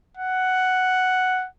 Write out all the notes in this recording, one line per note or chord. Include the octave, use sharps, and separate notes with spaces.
F#5